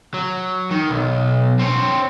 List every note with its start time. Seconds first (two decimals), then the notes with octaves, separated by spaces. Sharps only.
0.14 F#3
0.71 D#3
0.89 B1
1.59 C4 C#5